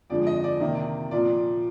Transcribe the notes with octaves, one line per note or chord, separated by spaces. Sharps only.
F2 D3 F3 G#3 D5
D#5
D5
C3 D#3 A#3
A#2 F3 A#3 D5